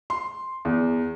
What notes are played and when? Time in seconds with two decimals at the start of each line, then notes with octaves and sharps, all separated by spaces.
0.10 C6
0.65 E2